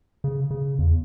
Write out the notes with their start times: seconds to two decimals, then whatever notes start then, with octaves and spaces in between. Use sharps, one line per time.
0.24 C#3
0.51 C#3
0.79 E2